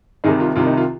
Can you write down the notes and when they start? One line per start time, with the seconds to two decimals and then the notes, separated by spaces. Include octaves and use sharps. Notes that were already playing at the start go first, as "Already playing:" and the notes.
0.24 C2 C3 D#3 D#4 G#4
0.40 F4
0.56 C2 C3 D#3 F4
0.67 D#4
0.77 F4